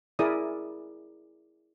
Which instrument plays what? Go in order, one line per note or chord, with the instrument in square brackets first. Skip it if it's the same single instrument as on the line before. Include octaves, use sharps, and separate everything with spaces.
[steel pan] E4 G#4 A#4 D5 D#6